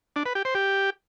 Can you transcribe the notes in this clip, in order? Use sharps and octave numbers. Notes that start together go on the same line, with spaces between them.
D4
B4
G4
C5
G4